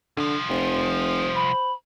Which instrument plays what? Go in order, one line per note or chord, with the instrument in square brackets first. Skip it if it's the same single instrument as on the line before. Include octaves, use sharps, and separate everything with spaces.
[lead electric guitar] C2 F3 [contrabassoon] D3
[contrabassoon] F1 [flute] C5
[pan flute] B5